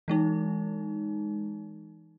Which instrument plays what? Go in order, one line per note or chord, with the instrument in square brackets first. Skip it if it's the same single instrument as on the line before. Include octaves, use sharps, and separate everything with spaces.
[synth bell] E3 G#3 D#4